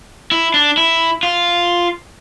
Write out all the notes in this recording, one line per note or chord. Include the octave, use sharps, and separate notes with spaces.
E4
D4
E4
F4